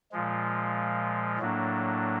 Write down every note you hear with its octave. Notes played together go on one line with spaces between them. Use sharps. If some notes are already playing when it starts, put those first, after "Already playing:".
A#2 F3 G#3
A2 F#3 A#3 D4